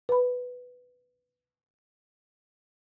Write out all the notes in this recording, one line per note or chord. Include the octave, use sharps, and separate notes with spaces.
B4 B5